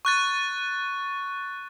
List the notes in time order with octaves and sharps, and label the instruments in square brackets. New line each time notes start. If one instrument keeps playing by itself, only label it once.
[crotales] C#6 F#6 A6